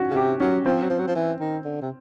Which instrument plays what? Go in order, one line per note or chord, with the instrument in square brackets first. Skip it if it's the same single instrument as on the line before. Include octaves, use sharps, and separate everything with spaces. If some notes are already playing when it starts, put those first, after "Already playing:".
Already playing: [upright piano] C#4 F#4
[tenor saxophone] C#3
[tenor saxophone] C3 [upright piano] G4
[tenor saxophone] F#3 [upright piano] C#4
[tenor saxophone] F3 [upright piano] C4
[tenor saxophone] F#3
F3
F#3
F3
E3
D#3
D3
C3